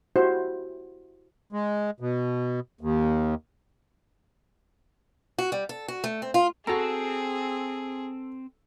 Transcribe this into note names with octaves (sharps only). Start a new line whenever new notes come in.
E4 F#4 G4 C5 E5
G#3
B2
D#2
F#4
G3
A4
F#4
A3
C4
F4
C4 F#4 G#4 A4 A#5